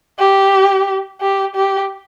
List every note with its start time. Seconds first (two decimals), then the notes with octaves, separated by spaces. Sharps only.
0.19 G4
1.21 G4
1.55 G4